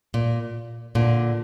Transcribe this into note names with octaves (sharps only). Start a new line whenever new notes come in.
A#2
A#2 D3